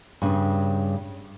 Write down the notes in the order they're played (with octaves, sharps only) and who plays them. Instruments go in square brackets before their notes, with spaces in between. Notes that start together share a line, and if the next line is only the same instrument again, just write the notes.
[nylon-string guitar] G2 C#3